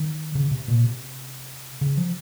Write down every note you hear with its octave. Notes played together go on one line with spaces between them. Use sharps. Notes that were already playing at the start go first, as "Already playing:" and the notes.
Already playing: D#3
C#3
C3
A#2
C3
C#3
F3